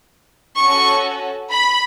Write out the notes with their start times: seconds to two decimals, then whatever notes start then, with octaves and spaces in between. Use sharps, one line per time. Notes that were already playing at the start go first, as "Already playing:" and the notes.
0.61 C#4 F#4 A4 C#6
1.52 B5